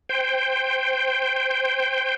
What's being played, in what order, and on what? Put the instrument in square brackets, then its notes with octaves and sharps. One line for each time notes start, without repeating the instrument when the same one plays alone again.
[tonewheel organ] C5 G5